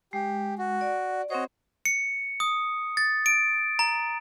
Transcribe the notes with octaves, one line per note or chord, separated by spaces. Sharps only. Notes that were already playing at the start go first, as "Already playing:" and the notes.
G#3 G4
F#4
D5
C4 F#4 C5 C#5 D#5
C#7
D#6
A6
D7
A#5